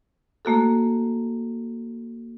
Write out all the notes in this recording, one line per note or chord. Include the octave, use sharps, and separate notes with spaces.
A3 A#3 F#4 A4